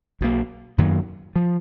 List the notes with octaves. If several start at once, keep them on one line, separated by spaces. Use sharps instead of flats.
B1 B2 A#3
F#2 D#3 F#3 A#3
F3